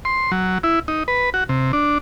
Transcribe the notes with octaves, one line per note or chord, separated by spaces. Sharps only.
C6
F#3
E4
D#4
B4
F#4
C3
D4